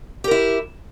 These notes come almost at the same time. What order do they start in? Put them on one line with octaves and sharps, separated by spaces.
G4 A#4 E4